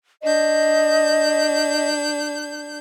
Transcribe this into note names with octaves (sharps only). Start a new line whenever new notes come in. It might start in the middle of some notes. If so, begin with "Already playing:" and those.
D4 D#5 G6